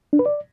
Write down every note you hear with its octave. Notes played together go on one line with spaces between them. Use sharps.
D4
B4
D5